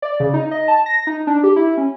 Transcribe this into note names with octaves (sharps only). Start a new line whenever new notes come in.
D5
C#3
D#4
D#5
A5
A#6
D#4
D4
G4
E4
C#4